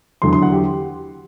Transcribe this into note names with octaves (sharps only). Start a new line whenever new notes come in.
E2 D3 F#3 C6
C6
F#5
G4